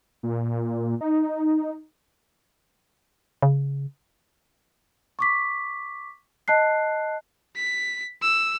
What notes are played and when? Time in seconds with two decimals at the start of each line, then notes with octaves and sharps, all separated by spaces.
0.23 A#2
1.01 D#4
3.42 C#3
5.19 C#6 D6 B6
6.48 D#5 A5 F#6 C7
7.56 B6
8.22 E6